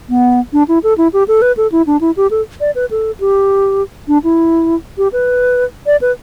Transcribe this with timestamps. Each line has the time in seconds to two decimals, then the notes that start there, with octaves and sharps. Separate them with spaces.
0.09 B3
0.53 D4
0.68 E4
0.83 A4
0.98 E4
1.13 G4
1.28 A4
1.42 B4
1.57 A4
1.72 E4
1.87 D4
2.01 E4
2.17 G4
2.31 A4
2.61 D5
2.75 B4
2.91 A4
3.20 G4
4.08 D4
4.24 E4
4.98 G4
5.13 B4
5.86 D5
6.01 B4